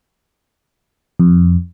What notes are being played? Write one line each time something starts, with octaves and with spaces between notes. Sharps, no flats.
F2